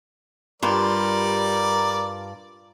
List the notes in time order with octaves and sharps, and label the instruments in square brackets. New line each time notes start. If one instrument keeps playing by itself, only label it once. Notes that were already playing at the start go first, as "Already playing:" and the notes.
[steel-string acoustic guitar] G2 F4 [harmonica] G3 A#4 D5